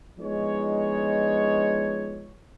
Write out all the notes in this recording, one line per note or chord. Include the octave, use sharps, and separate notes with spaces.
F3 G#3 B3 D4 D#4 C#5